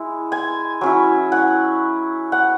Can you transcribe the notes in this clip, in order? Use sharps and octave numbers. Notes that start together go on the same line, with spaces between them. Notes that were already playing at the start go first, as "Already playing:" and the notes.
Already playing: G#3 E4
G#5
F#3 C#4 E4
F#5
F#5